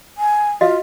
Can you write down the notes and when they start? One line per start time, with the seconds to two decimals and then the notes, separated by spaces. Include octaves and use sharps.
0.18 G#5
0.61 F4 F#4 D#5 F5